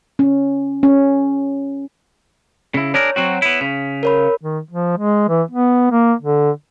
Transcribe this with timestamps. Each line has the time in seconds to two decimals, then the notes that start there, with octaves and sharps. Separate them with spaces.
0.19 C#4
0.83 C#4
2.74 C#3 E4
2.94 D4 G#4 A#4 C#5
3.16 F#3 C4 F#4
3.42 B3 E4
3.61 C#3 B6
4.03 A#4 C#5 B5
4.41 D#3
4.71 F3
4.97 G#3
5.29 E3
5.51 B3
5.91 A#3
6.22 D3